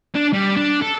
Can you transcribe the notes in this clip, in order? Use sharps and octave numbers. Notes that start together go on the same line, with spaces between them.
D4
G3
D4
A4